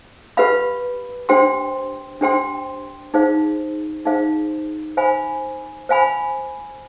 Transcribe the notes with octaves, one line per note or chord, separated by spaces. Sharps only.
G4 B4 F5 B5
D4 G4 C5 G5 C6
D4 G4 C5 G5 C6
D#4 G#4 C5 F5
D#4 G#4 C5 F5
C5 F5 G#5 B5
C5 F5 G#5 B5